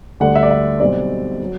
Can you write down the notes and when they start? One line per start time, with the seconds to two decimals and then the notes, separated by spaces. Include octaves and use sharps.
0.20 D2 D3 G3 D4 F#5
0.35 E5
0.43 D5
0.51 E5
0.80 B1 B2 G3 C4 D5
1.43 F#3